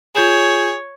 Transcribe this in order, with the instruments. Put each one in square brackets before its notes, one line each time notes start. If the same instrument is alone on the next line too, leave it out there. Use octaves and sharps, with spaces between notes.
[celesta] F4 G6 E7 [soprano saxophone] G#4 [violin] C#5